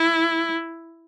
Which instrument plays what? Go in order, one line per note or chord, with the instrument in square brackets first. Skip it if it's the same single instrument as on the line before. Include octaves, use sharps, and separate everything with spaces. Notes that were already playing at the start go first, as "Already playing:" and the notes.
Already playing: [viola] E4